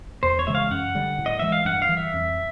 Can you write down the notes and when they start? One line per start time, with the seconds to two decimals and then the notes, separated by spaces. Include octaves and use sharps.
0.23 E2 C5
0.39 C#5
0.47 C#3 E3 G#3 E5
0.55 F5
0.71 F#2 F#5
0.95 D3 G3
1.19 A2
1.26 D#5
1.39 E3 G#3 E5
1.52 F5
1.65 G2 F#5
1.82 F5
1.89 E3 G3
1.97 E5
2.14 F2